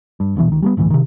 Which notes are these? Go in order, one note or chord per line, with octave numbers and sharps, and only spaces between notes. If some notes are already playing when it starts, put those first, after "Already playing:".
G2
D#1 A#1 B2 E3
C#2 D#3
G3 A3 B3
G1 D2 A2 E3
C3 D#3